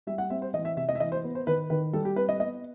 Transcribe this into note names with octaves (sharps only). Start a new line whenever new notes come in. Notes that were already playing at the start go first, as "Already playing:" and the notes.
G3 E5
F#5
C4 E5
C5
E3 D#5
E5
C3 E5
D#5
E5
E3 D#5
C5
B3
C5
D#3 B4
D#3 B4
G3 A4
G4
C4 B4
D#5
B3 D#5